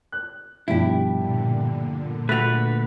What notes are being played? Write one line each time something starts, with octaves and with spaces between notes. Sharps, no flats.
F#6
G2 B2 F3 E4 G4
A#2 D3
A3 F#4 B4 A6 A#6 F7